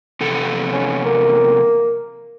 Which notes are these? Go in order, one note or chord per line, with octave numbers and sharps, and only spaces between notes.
E2 C3 A4
C#4
A#3